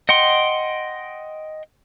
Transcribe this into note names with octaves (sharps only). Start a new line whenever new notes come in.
D#5 F#5 G5 C6